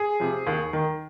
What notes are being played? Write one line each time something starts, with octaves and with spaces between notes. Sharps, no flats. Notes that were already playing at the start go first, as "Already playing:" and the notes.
Already playing: G#4
C3 F3
D#2
D#3